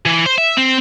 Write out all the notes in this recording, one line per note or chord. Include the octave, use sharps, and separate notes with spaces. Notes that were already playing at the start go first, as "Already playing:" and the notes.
E3
C5
E5
C4